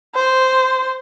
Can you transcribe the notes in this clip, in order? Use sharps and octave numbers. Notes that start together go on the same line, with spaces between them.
C5